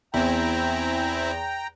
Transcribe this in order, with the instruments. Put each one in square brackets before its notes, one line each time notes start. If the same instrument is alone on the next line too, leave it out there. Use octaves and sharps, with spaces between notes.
[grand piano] E2 [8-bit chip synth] C4 E4 [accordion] G5 A#5